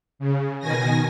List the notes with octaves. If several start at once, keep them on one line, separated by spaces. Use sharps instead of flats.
C#3
B2 D#3 G#5 A#6